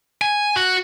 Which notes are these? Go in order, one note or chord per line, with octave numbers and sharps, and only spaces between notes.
G#5
F#4